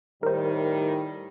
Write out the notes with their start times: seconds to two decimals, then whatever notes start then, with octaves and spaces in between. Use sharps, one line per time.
0.23 A2 D#3 G3 A#4 C5